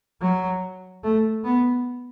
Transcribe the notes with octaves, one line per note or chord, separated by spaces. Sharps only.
F#3
A3
B3